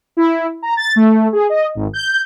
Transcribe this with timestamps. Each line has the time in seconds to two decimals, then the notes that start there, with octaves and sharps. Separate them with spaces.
0.17 E4
0.62 A#5
0.77 A6
0.96 A3
1.33 G#4
1.49 D#5
1.75 G#1
1.93 G6